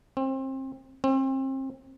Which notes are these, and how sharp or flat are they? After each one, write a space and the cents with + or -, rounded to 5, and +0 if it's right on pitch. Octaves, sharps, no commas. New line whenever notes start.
C4 +30
C4 +35